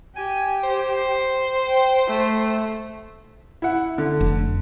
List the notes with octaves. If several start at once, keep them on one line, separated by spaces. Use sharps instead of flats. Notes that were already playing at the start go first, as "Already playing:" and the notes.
G4 G#5
C5
G5
A3
E4 F#5
D3
F1